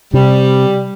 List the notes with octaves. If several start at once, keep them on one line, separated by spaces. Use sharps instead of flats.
C3 G3